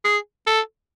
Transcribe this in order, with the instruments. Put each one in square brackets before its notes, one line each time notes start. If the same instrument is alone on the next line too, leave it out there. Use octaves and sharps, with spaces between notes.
[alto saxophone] G#4
A4